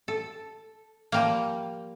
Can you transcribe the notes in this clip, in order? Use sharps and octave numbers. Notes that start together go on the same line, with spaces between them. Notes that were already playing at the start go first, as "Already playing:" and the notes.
A4
F3 G3 A#3